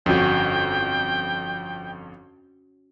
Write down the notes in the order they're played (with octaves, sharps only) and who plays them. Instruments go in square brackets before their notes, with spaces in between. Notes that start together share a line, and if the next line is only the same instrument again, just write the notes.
[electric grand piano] G1 F2 [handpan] C#4 F#4 [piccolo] G5